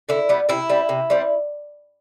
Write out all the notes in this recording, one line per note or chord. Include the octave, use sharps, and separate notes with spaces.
D3 E4
G3 B3
C3 E4
G3 C4
C3
G3 C4